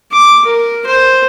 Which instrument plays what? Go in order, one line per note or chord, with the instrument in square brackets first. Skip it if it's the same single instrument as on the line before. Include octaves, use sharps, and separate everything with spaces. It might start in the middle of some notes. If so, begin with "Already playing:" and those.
[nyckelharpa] D6
A#4
C5